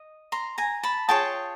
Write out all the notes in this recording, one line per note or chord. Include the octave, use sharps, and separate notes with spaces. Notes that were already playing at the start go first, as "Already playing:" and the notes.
Already playing: D#5
A#5 C6
G#5 A#5
A5 B5
F4 G#4 C#5 G5 A5